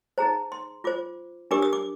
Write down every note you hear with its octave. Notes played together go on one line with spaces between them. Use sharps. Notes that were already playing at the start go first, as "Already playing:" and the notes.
D#4 G#4 C5 A#5
C6
F4 C5 D6
D4 G4 A#4 D6
D#6
D6